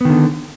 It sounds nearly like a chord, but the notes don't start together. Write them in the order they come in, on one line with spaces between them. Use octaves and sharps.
B3 D#3 D3